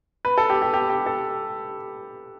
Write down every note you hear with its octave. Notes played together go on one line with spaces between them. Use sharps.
B4
A4
G4
G4
G4
G4
A4